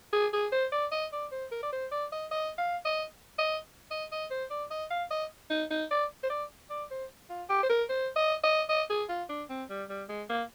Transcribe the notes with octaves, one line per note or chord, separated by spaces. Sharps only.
G#4
G#4
C5
D5
D#5
D5
C5
A#4
D5
C5
D5
D#5
D#5
F5
D#5
D#5
D#5
D#5
C5
D5
D#5
F5
D#5
D#4
D#4
D5
C5
D5
D5
C5
F4
G4
C5
A#4
C5
D#5
D#5
D#5
G#4
F4
D4
C4
G3
G3
G#3
A#3